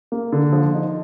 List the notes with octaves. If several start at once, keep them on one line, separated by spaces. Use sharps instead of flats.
A#3
D3
F3
D#4